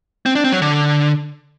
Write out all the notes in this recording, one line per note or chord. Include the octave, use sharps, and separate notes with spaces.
C4
D4
C4
F#3
D3